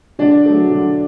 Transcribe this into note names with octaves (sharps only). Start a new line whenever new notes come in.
D3 D4 D5
F#3 A3
D3